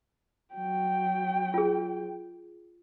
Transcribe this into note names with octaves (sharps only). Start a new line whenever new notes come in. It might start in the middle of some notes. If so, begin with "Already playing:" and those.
F#3 G5
F4 G#4